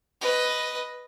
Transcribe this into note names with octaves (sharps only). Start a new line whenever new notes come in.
B4 D#5